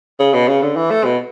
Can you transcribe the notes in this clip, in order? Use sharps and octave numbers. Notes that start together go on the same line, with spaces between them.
C#3
B2
C#3
D3
E3
A3
B2